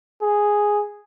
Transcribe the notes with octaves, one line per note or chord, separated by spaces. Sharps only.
G#4